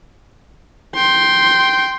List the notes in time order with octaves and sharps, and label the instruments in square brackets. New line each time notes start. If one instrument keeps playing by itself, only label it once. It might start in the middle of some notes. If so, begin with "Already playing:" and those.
[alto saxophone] G5 [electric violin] C6